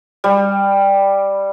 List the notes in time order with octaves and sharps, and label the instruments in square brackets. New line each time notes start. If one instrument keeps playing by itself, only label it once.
[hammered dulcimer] G3